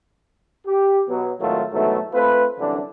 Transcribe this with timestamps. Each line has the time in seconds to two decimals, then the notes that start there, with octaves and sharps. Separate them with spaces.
0.67 G4
1.08 B2 F#3
1.40 G#1 A2 D#3 F#3 A3 F4
1.72 G#2 B2 E3 F#3 A3
2.14 A3 C4 F4 B4
2.58 C2 F#2 D3 E3 D4